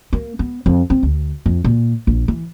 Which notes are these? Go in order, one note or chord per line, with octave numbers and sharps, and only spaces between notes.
A#3
B3
F2
C4
D2
F2
A#2
A#1
E3